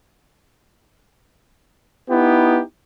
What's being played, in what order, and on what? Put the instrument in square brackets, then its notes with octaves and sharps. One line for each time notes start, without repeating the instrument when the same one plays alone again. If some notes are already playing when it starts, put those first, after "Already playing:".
[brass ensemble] B3 D#4 E4 G4